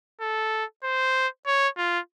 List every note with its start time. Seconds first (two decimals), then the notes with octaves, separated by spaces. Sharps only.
0.21 A4
0.84 C5
1.46 C#5
1.77 F4